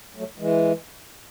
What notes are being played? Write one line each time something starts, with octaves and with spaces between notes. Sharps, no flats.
F#3 A3
E3 G#3